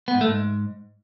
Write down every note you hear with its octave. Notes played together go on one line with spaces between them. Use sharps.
B3
G#2
A3
G#2